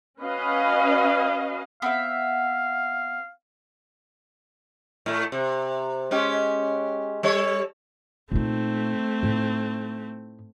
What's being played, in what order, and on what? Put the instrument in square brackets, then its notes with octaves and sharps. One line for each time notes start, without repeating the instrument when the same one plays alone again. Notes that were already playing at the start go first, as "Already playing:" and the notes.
[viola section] C#4 F#4 B4 D#5 F5
[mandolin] B3 C4 E5 [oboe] F5
[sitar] A2 A3
C3
G#3 C#4 G4
G3 A4 C#5
[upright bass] A#2 D#4 [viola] A3 C4
[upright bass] A2 D#4